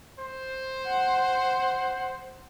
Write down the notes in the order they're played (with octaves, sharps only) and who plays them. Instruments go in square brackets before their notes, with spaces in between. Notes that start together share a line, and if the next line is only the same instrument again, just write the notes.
[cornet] C5
[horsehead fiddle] F#5